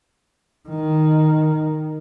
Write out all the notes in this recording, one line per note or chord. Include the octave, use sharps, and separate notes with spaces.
D#3